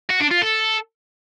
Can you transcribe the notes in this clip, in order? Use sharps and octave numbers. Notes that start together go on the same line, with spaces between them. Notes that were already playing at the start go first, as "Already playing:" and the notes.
F#4
D4
F4
A4